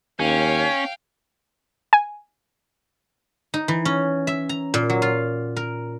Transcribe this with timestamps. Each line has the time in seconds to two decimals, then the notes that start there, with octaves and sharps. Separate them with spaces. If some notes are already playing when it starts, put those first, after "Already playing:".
0.19 D#2 C#4 F5 G5
1.93 G#5
3.54 D#4
3.68 E3
3.85 C#4
4.27 E5
4.49 A#5
4.74 A#2
4.90 F#3
5.02 F4
5.57 A#4